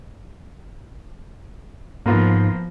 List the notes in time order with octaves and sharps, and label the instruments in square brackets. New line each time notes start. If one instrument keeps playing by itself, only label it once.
[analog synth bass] G#2 [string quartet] F3 [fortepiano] A#3 B3 F4